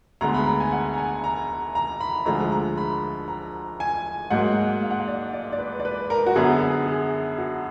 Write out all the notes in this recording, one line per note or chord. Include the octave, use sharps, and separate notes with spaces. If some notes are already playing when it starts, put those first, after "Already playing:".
D2 D3 G#3 B3 A#5
B5
A#5
G#5
F#5
A#5
G#5
A#5
A#5
B5
D2 D3 F3 G#3 A#5
A#5
B5
A#5
G#5
G#2 F#3 A#3 F#5
F5
F#5
F5
D5
D5
D5
B4
D5
B4
A#4
F#4
F#2 D3 F#3 B3 G#4
G#4
G#4
F#4